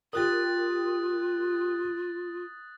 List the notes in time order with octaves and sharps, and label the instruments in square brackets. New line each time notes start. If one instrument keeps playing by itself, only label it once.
[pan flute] F4 [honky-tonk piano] G4 A#4 [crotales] D#6 F#6 A6